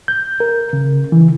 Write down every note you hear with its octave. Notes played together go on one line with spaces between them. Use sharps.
G6
A#4
C#3
E3